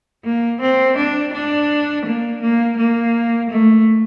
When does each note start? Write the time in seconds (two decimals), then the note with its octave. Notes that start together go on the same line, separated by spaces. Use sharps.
0.25 A#3
0.61 C4
0.97 D4
1.33 D4
2.05 A#3
2.41 A#3
2.77 A#3
3.50 A3